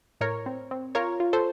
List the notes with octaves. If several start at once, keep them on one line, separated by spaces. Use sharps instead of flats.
A2 A#4 C#5
C4
C4
F4 A#4 C#5
F4
A4 C5